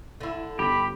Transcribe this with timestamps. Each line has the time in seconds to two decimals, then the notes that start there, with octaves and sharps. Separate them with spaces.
0.21 D3 E4
0.59 G1 G4 B5